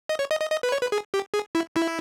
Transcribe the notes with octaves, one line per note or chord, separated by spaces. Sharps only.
D#5
C#5
D#5
D#5
D#5
B4
C#5
B4
G#4
G4
G#4
E4
E4